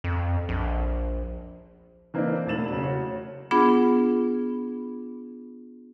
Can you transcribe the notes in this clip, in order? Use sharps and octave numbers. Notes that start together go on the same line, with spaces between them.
F2
A#1
E3 A#3 C4 D4 D#4
E1 A3 E4 A6 E7 F#7
C#3 F#3
F#4 C#5
B3 D4 F4 G#4 F#5 B5